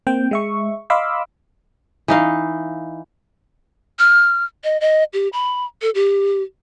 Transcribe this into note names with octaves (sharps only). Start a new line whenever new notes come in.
A#3 C4 G5
G#3 E5 C#6
D#5 F5 B5 C6 D6 E6
E3 D#4 F5
F6
D#5
D#5
G4
B5
A4
G4